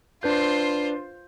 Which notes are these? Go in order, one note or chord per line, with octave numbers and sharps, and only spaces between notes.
D4 F4 B4 C5 G6